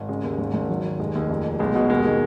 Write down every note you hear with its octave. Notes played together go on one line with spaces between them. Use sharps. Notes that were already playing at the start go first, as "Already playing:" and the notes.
Already playing: G#1
C#3 G#3
D#2
G#1
G#1
D#3 F#3
D#3
F1 G#3
D#2
F2
F1
B1 G#3
B2
D#2 G#3
D#3